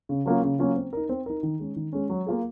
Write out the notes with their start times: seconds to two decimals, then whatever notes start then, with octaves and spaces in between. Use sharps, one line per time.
0.09 C#3
0.26 F#3 A#3 C#4 F4
0.43 C#3
0.59 F#3 A#3 C#4 F4
0.76 C4
0.93 D#4 A#4
1.09 C4
1.26 D#4 A#4
1.43 D#3
1.59 G#3 C#4
1.76 D#3
1.93 G#3 C#4
2.10 F#3
2.27 A#3 F4 G#4